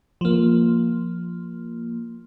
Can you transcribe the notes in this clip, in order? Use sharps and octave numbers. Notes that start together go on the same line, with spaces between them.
F3 A#3